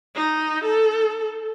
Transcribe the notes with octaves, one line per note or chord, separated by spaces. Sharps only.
D#4
A4